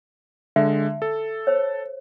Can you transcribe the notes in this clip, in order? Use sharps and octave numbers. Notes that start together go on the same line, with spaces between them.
D3 G#3 E5
A4
C5 C#5